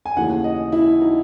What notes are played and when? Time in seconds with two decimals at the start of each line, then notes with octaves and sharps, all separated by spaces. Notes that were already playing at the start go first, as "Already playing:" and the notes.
0.05 G#5
0.16 D#2 C#3 E3 A3 F#5
0.44 D#5
0.72 E4
1.01 D#4